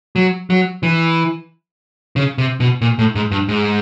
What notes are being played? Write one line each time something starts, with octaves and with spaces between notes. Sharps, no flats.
F#3
F#3
E3
C#3
C3
B2
A#2
A2
G#2
G2
G#2